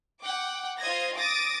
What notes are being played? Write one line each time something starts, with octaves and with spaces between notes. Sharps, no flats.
F#5 G5 D6
F4 C5 D#5 G#6 A#6
D6 D#6 A6 A#6 D7